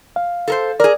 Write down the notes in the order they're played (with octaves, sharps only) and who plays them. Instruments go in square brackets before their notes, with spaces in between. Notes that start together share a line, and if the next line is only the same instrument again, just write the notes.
[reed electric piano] F5
[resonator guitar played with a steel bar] A4 A#4 C5
[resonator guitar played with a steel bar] G#4 A#4 [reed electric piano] D5